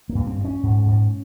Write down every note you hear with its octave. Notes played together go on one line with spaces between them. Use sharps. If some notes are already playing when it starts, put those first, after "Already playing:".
A#3
G2
C4
G2
C#4
G#2
G#2